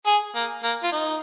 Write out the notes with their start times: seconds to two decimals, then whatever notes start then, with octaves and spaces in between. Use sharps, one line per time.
0.07 G#4
0.35 A#3
0.63 A#3
0.84 F4
0.92 D#4